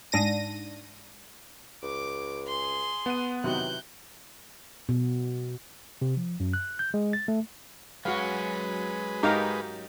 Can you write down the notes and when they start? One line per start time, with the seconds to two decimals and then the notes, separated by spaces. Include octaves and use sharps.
0.12 G#2 D4 A#6 D#7
1.83 C#2 D6
2.47 G#4 C6
3.06 B3 F#5 D#7
3.44 C3 D#3 E3 F#3 F#6 G6
4.89 B2
6.02 C3
6.17 F3
6.40 F#2
6.53 F#6
6.79 G6
6.94 G#3
7.13 A6
7.28 A3
8.05 F#3 G#3 C#4 F#4 B4 F5
9.23 G#2 D#4 G4 A#4 F5 A#5